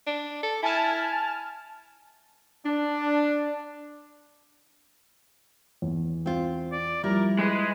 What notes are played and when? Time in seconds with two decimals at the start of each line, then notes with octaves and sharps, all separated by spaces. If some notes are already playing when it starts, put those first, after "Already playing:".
0.06 D4
0.43 A4
0.62 E4 G#5 A5 F6
2.66 D4
5.82 E2
6.26 C4 F4
6.72 D5
7.04 F3 G3 E4 A#4
7.39 G#3 B4